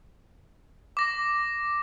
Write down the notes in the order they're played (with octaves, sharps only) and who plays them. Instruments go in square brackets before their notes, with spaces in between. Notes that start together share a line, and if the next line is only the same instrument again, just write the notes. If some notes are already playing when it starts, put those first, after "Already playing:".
[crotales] D6 A#6